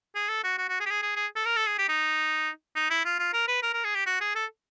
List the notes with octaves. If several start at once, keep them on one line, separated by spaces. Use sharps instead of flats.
G#4
A4
F#4
F#4
F#4
G#4
G4
G#4
G#4
G#4
A4
A#4
A4
G#4
G4
D#4
D#4
E4
F4
F4
A#4
B4
A#4
A#4
G#4
G4
F#4
G#4
A4